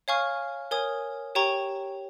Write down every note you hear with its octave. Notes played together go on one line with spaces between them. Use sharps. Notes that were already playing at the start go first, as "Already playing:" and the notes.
C#5 F5 G#5 C#6 F6
A#4 C#5 G#5 D#6
G4 C#5 G5 A#5 C#6